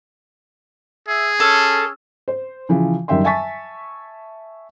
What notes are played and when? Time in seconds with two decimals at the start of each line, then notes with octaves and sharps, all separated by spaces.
1.08 G#4 E5
1.40 C#4 A4
2.28 C5
2.69 C#3 E3 F3
3.08 F#2 D#3 G3 E5 G5 C6
3.24 E5 G#5 A5 C#6 A6 B6